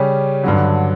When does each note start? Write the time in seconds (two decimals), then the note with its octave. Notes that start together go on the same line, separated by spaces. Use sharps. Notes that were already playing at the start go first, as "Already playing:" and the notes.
Already playing: C#3 G3 C#4 G4
0.44 G2 D3 F#3